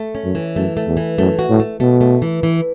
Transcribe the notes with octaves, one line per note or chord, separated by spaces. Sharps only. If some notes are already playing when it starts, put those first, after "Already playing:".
Already playing: A3
C#4
F#2
E3
F#2 A3
A3
E2
E3
F#2 A3
F#4
A2
A3
B2 A3
A3
E3
E3